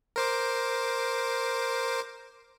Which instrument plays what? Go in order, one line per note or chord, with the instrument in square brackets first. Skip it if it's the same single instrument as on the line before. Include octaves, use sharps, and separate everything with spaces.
[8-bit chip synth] A#4 C5 D6